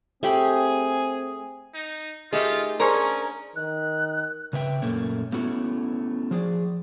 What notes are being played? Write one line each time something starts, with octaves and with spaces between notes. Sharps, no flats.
A3 C4 G4 G#4 B5
D#4
A3 D#4 F4 G4 G#4 A#4
C#4 D4 G#4 A#4 C5 A#5 C#6
D#3 F#6
C#3 B4 E5 G5
F#2 A#2 A3 A#3 C#4
A3 B3 C#4 E4 F#4
F3 G#4 D5